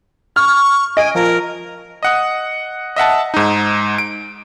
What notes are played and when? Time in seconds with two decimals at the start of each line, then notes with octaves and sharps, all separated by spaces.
0.36 C#6 F6
0.97 D#5 G#5 D7
1.15 F3 A#4
2.03 D#5 F#5 D#6
2.96 D#5 E5 F#5 A5
3.34 G#2 D#4
3.98 D7